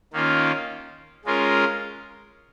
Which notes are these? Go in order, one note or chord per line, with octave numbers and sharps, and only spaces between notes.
D#3 A#3 C#4 F4
G#3 C#4 F4 A#4